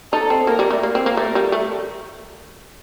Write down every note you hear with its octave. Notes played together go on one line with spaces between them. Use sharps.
D#4 A4
C4
A#3 A#4
G3
A3
A#3
C4
A#3
A3 A#4
G3
A3